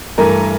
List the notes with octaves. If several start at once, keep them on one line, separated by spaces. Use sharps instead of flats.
G2 E3 A3 A#4